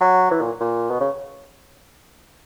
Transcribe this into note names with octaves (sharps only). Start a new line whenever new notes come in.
F#3
E3
A#2
A#2
B2
C#3